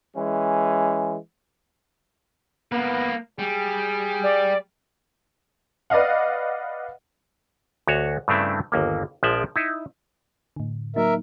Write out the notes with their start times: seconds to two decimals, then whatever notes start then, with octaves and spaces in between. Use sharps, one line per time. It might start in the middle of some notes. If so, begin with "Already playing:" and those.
0.16 E3 G#3 C#4
2.72 A#3 B3 B4
3.39 G3 G#4
4.24 D5
5.90 B4 D5 D#5 F5 F#5
7.87 D2 F#4 C#5
8.28 G2 C#3 A3 C4 D4 E4
8.72 G1 D#2 A#3
9.23 A#1 F3 G#3 D5 E5 G5
9.56 D#4 E4
10.56 A2 D3
10.96 F#3 A#3 D#4 A#4 E5